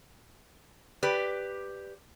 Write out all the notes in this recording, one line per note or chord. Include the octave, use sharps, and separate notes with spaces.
G4 B4 D5